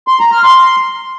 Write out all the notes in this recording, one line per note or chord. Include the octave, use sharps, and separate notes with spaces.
C6
A#5
F6
C6